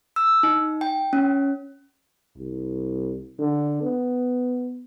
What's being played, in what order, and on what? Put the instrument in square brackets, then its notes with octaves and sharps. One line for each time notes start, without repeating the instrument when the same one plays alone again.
[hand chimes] E6
D#4
G5
C#4
[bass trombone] C2
D3
B3